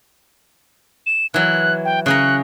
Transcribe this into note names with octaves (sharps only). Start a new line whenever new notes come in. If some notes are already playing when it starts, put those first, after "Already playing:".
E7
E3 F#3 F#6
G5
C#3 C#4 A#5 F#6